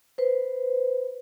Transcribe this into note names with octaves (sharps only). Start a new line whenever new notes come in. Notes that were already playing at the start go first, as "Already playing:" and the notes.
B4 C5